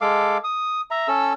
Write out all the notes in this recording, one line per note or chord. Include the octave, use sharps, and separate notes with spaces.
G#3 A4 F5 D6
D#6
E5 A#5
C#4 A4 E6